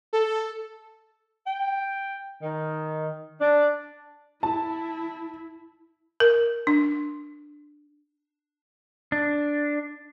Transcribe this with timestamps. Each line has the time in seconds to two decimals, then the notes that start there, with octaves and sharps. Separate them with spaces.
0.13 A4
1.47 G5
2.42 D#3
3.40 D4
4.43 E4 A5
6.20 A#4
6.67 D4
9.12 D4